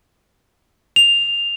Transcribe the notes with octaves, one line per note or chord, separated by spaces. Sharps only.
F7